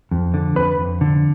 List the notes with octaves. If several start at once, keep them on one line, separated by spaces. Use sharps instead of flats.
F2
D3
F2 B4
F2
D3